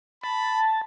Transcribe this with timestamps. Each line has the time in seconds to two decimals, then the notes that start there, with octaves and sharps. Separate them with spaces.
0.24 A5 B5